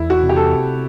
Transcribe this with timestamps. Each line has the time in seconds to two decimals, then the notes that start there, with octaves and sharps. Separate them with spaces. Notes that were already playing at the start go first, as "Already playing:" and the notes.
Already playing: E2 E4
0.10 F#4
0.23 C3
0.29 G4
0.36 A4